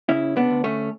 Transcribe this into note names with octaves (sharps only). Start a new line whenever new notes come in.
C#3 C#4 E4
B3 D4
D2
A3 C#4